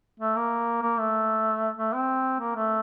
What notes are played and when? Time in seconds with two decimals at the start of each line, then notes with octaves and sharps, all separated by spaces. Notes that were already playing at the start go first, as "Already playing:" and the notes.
0.19 A3
0.36 A#3
0.82 A#3
0.99 A3
1.77 A3
1.93 C4
2.40 A#3
2.56 A3